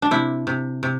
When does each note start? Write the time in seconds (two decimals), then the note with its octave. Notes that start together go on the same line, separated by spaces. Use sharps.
0.02 D4
0.11 C3 E4
0.47 C3
0.83 C3